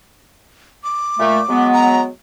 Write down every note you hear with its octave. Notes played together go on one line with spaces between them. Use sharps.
D6
A#2 A3
F#3 G#3 B3
A#5